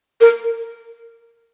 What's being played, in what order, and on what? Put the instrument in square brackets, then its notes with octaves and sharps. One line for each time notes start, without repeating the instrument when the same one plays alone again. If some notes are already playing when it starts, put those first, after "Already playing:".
[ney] A#4